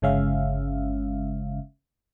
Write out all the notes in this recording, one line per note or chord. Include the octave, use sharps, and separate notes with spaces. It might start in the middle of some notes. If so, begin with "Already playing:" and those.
G1 C#3 G#3 C#4 E5 F5